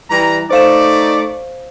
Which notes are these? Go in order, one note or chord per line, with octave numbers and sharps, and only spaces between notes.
E3 G3 A#5
A3 D#4 C5 D5 F5 E7